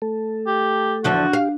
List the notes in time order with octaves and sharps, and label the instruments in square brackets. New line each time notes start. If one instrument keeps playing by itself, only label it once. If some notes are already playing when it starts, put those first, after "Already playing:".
[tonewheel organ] A3 A4
[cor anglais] G4
[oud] E2 D3 F3 [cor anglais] F#4
[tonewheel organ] G4 [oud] F5